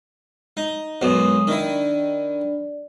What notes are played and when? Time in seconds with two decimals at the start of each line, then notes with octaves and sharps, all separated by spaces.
0.57 D#4
1.01 B1 F#2 B2 F#3 G#3 D#6
1.47 D#3 D4 E4 D5